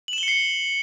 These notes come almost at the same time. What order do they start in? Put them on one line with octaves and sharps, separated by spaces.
F#7 E7 G7 C#7 C7